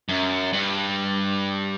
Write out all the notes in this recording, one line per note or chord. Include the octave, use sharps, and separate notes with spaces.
F#2
G2